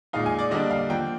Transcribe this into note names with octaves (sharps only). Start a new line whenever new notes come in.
A#2 G#3 D#4 F5
G#5
D5
D3 G3 A#3 D4 D#5
F5
D3 F3 A#3 G5